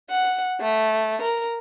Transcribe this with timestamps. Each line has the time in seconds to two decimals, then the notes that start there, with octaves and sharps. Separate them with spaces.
0.10 F#5
0.61 A3
1.22 A#4